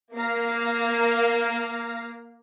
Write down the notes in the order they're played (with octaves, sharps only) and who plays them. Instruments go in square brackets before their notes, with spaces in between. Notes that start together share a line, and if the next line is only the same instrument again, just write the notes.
[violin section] A#3 [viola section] F5 A#5